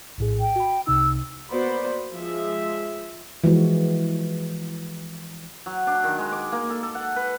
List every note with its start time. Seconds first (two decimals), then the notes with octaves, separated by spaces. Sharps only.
0.18 A#1 A2 G#4
0.40 G5
0.56 F#4 B5
0.87 C2 C3 D#4 E6
1.51 A#3 B3 F#4 C5 D5 B5
2.13 F3 G#3 E5
3.44 E3 F3 G#3 F#4
5.66 F#3
5.87 D4
6.04 D#3
6.18 G#3
6.32 D6
6.52 A#3
6.70 A4
6.83 A4
6.95 F#5
7.16 B4